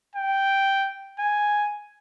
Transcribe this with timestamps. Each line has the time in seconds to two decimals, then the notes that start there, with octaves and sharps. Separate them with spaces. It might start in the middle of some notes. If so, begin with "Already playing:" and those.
0.16 G5
1.20 G#5